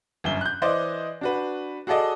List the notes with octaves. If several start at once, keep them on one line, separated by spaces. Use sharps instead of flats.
G1 F#2 G7
F#6 G6
E3 C5 D5 D#5
D4 F#4 B4
F#4 G#4 A4 D5 D#5